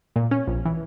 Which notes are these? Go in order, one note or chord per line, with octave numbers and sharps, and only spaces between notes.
A#2
C#4
A#1
E3